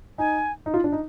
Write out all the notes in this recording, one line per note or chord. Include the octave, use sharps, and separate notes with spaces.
D#4 G#5
D#4
F4
D4
D#4